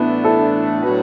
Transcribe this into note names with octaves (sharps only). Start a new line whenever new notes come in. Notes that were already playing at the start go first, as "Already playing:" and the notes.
Already playing: A2 E3 A3 B3 D4 E4
E4 A4
A2 F#3 D4 F#4 B4